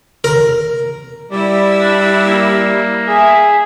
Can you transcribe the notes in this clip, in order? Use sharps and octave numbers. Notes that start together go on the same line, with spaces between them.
A#4
G3 E4 D5 E6
D4
A#3
G#4 E5